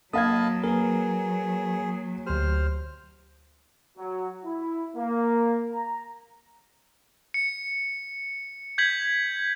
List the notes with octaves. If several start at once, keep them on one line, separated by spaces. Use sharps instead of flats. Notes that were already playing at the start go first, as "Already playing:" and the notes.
F#3 A#3 D#5 F5 A5 B5 D#6 G#6
A#3 G#4 A#4 B4
D2 G4 C5 F6
F#3
E4
A#3
A#5
C#7
G6 G#6 B6 F#7